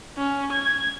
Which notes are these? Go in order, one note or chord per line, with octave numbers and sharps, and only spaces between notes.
C#4
G#6